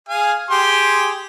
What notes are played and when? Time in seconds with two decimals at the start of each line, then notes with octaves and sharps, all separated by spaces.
0.09 G#4 F5 G#5
0.50 G4 G#4 C6